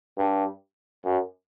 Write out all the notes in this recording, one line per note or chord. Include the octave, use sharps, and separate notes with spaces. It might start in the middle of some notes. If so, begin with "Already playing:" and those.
G2
F#2